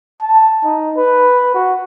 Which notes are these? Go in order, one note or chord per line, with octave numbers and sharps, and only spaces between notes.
A5
D#4
B4
F#4